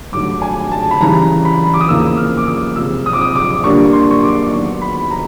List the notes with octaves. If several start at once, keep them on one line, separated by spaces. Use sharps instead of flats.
G2 D#3 F#3 A3 D6
G#5
A5
B5
C#3 E3 G3 A#5
B5
D6
D#6
E2 C#3 F3 A#3 E6
F6
D6
D#6
C3 F3 G#3 E6
D#6
D6
D#6
D6
D3 G3 A#3 D4 F4 C#6
C6
C#6
D6
D#3 F#3 B3 C#6
B5
A#5